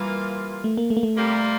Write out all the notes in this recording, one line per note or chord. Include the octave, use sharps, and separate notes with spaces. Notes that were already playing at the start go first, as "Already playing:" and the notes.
Already playing: E3 G3 A#3 F4
A3
A#3
A3
A#3
A3
C3 G3 A#3